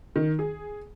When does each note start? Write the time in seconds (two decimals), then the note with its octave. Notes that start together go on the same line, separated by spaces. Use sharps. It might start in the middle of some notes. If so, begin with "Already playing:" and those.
0.16 D#3
0.39 G#4